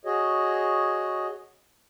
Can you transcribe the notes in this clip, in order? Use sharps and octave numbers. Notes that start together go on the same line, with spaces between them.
F#4 G#4 C#5 D#5